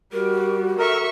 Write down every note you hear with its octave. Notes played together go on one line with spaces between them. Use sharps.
G3 F#4 A#4
A4 A#4 E5 C#6